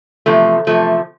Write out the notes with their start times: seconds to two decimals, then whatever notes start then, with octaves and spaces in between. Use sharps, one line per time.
0.26 E2 C3 F3 A3
0.67 E2 C3 F3 A3